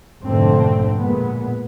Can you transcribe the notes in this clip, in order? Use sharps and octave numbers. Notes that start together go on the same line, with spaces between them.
F2 G#2 B2 D3 A3 C4
A#2 G#3 B3